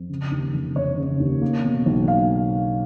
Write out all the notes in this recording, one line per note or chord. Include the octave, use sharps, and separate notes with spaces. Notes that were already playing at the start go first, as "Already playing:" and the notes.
Already playing: F2
C#3
D#2
F1
F1 C#5
C#3
D#2
A#3
B2
B1
F5